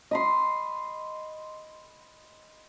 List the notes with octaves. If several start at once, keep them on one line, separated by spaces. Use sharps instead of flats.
D#5 B5 C6